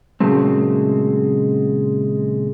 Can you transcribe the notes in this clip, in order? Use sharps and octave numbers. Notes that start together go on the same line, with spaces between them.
A#2 C#3 F#3 G#3 A3 C4